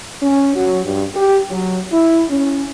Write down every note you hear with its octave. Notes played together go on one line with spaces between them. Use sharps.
C#4
F#3
G2
G4
F#3
E4
C#4